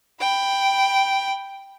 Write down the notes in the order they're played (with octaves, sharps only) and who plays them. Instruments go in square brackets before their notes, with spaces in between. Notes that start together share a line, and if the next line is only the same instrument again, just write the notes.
[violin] G5 B5